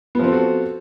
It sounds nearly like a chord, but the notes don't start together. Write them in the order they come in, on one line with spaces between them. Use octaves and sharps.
B3 F3 C4 A4 F#4